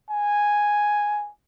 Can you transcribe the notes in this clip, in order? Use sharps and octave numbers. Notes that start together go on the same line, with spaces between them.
G#5